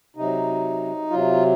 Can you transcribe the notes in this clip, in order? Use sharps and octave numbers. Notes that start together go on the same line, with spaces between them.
C3 F#3 D#4
C3 F#3 F4